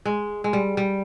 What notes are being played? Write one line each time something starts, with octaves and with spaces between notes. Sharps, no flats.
G#3
G#3
G3
G3